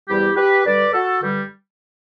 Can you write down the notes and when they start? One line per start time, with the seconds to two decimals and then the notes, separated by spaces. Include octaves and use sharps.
0.08 E2 C3 G3 E4 G4
0.36 G4 B4
0.65 G2 D3 G3 B4 D5
0.93 F#4 A4
1.22 G2 D3 G3